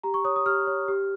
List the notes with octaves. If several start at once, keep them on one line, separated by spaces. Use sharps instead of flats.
G4 A#5
C#6
C#5 D#6
D#6
G4 F6
C#5
G4